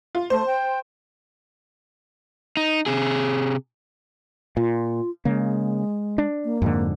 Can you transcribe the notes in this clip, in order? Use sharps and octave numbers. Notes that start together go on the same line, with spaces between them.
F4
A3 C5
G5
D#4
C3 G#4
A#2 F4
C#3 G#3 A#3
D4
A#3
F2 G#2 D3